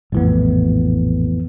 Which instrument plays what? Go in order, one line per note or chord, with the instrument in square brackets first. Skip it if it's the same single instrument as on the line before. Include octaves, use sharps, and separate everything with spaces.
[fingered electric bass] A#1 A2 [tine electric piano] F2 E3 B3